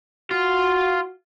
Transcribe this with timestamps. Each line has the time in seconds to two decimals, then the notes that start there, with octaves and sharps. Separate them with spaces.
0.31 F4 F#4